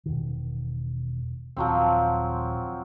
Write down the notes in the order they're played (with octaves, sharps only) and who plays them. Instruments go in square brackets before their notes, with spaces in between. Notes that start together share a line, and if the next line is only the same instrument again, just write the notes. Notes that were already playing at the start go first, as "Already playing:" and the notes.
[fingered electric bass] E1 D#3
[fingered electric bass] D#1 [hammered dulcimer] F3 F#3 C4